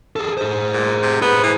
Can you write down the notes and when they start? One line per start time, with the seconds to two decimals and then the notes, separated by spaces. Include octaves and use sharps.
0.16 G#4 A4
0.37 G#4 C5
0.74 A#2
1.03 C3
1.22 B3 G#4 C5
1.44 E3